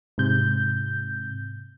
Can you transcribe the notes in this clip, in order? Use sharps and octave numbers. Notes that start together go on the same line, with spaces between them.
G#2 C3 G6